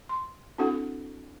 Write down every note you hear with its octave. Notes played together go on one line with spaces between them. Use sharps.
C6
C4 D4 E4 F#4 A4 F#5